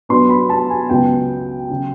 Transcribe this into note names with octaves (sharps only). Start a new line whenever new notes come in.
B2 F#3 B3 D4 C6
B5
A5
G#5
C#2 B2 F#3 B3 G5
C#3 F#3